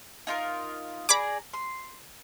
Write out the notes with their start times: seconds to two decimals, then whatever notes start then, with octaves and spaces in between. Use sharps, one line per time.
0.27 D#4 F4 A#4
1.09 G#4 D5 A#5 B5 D6
1.54 C6